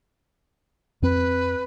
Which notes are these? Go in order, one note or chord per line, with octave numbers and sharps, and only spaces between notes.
F2 C4 B4